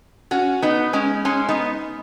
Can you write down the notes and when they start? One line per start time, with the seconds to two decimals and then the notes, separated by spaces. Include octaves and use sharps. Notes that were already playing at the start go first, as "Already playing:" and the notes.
0.31 C#4 F#4
0.62 B3 D#4
0.93 G#3 C#4
1.25 G#3 C#4
1.49 B3 D#4